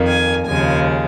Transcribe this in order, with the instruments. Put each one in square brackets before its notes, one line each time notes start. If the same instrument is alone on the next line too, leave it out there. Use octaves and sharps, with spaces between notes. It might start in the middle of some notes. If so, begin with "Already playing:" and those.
Already playing: [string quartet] F2 D#3 A#3
G#5
D#2 C#3 F3 G#3 G#5